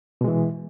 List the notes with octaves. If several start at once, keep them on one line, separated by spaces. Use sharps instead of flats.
B2 E3 G#3